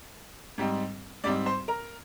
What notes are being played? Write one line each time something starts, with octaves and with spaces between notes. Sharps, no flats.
G#2 G3 C4 D#4
G#2 G3 C4 D#4 D5 D6
C5 C6
A#4 A#5